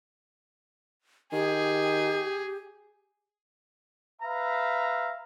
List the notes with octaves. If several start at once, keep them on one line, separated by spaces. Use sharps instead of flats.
D#3 G4 G#4
B4 E5 F5 A#5